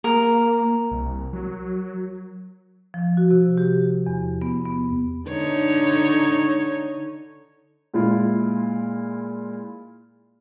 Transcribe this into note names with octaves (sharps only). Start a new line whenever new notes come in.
A#3 A#4
C2
F#3
F3
F#4
C3
G4
E2
B3
B3
D3 D#4 C#5
A#2 G#3 E4 F4